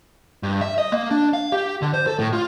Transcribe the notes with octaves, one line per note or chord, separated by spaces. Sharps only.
G2
E5
D#5
A#3
D4
F5
G4
D3
C5
A4
A2
F4